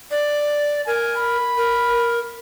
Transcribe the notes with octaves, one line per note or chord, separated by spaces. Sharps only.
D5
A#4 G#5
B5
A#4